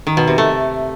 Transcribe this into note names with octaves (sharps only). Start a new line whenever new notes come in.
D#3
B2
C3
A3